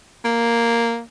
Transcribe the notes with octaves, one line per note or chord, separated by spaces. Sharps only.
A#3